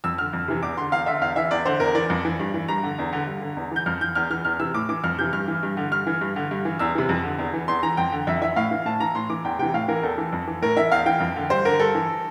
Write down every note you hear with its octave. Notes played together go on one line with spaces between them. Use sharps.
F2 E6
D3 F6
F2
C3 E3
E2 D6
D3 C6
E2 F5
D3 E5
E2 F5
E3 E5
E2 D5
D3 C5
E2 A#4
E3 D5
F2
E3
G2
E3
G2 A#5
D3
E2
D3
G2
D3
E2
E3 G6
F2 F6
E3 G6
E2 F6
E3 F6
E2 F6
C3 E3 E6
A2 D6
E3 D6
F2 F6
C3 E3 G6
G2 F6
E3
G2
D3
G2 F6
E3
G2
D3
G2
E3
E2 E6
C3 E3
F2
D3
E2
E3
E2 C6
E3 A#5
F2 G5
D3
F2 E5
E3 E5
A2 F5
E3
A2 A5
E3 A#5
A2 C6
E3 D6
E2 G5
C3 E3 G5
A2 F5
E3 A#4
E2 A4
E3
F2
E3
A2 A#4
E3 E5
E2 F5
E3 G5
F2
D3
G2 C5
D3 A#4
G2 A4
E3